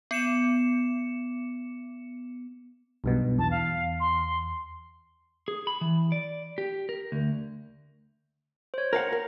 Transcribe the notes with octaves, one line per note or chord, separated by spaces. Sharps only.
B3 C#7 E7
B1 G2 B2
E2 A5
F5
C6
G#4
B5
E3
D5
G4
A#4
D2
C5 C#5
A#4 F5 F#5 A#5
A#4